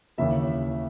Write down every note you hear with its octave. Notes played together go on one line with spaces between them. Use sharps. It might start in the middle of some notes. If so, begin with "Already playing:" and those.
D#2 C#3 E3 A#3 E5